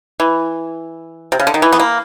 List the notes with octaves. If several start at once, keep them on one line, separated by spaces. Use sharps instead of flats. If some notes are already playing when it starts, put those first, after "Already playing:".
E3
C3
C#3
D3
D#3
E3
B3
A#3